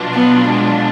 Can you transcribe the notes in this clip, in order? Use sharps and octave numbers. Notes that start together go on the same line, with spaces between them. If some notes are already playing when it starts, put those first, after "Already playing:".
Already playing: B2 F#3 D4 F4
B3
G#3